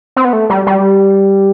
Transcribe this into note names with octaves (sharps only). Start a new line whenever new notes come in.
C4
B3
A3
G3
G3